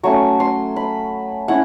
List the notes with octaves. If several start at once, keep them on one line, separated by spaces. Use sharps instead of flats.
F#3 A3 C#4 C#6
C6
B5
C#4 E4 F#5